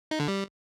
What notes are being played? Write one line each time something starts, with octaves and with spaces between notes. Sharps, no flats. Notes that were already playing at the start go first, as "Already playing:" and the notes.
D#4
D3
G3